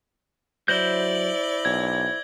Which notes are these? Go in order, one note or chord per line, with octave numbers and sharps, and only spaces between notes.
F#3 E4 C5 D5 G6 A#6 F#7 G7
B1 G#6